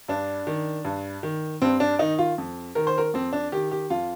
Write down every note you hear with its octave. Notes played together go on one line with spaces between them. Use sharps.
G2 D4
D#3
G2
D#3
G2 C4
D4
D#3 D#4
F4
F2
D#3 A#4
C5
A#4
F2 C4
D4
D#3 G4
G4
F2 F4